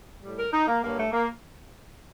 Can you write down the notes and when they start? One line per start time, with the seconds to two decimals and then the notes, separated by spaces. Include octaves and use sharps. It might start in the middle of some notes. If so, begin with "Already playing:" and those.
0.23 A2 G3
0.38 A#4
0.53 D#4
0.67 A#3
0.82 G2 F#3 A#3
0.98 A3
1.12 A#3